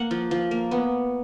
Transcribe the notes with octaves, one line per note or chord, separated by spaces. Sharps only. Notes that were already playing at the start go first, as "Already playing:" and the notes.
Already playing: A#3 F#5
F3
F3
A#3
B3